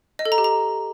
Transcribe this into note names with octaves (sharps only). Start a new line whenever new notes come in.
D#5
A4
A#5
G4
A#5